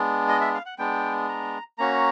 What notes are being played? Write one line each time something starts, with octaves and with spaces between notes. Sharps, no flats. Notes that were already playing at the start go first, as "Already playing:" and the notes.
Already playing: G#3 B3 D4
D#5
E5
F5
F#5
G#3 B3 D4 G5
A#5
A#3 C#4 F#4 A#5